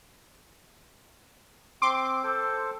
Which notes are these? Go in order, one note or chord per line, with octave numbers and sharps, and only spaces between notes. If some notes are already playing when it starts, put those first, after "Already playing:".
C4 C6 D6
A4 C5